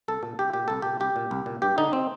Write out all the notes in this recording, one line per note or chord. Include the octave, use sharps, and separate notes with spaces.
C2 A4
A#2
C2 G4
A#2 G4
C2 A4
A#2 G4
C2 G4
A#2
C2
A#2
G2 G4
D3 D#4
C4